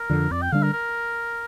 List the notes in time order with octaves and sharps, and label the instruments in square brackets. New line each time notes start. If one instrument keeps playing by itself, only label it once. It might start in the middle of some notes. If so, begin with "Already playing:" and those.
Already playing: [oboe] A#4
[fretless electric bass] F2 D3 F3
[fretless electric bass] F2 [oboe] D5
[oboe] G5
[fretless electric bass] D3 G3 D4 [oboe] F5
[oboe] A#4
A#4